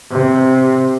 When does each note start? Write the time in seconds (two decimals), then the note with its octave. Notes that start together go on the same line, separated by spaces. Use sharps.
0.10 C3